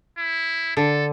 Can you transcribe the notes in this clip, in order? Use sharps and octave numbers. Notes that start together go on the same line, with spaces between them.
E4
D3 A4